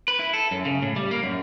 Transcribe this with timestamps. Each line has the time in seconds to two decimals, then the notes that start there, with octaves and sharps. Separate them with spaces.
0.08 B4
0.19 E4
0.33 A4
0.51 F#2
0.65 C#3
0.82 A2
0.96 G3
1.11 A#3
1.23 F#2